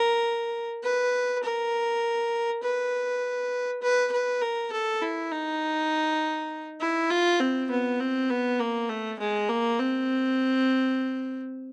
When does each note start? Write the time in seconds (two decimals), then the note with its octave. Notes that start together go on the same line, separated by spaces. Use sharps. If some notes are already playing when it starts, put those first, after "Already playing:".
Already playing: A#4
0.83 B4
1.43 A#4
2.63 B4
3.82 B4
4.12 B4
4.42 A#4
4.72 A4
5.02 E4
5.31 D#4
6.80 E4
7.10 F4
7.40 C4
7.70 B3
8.00 C4
8.30 B3
8.60 A#3
8.89 A3
9.19 G#3
9.49 A#3
9.79 C4